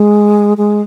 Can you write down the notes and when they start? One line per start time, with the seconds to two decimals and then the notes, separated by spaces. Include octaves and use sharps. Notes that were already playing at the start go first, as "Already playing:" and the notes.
Already playing: G#3
0.57 G#3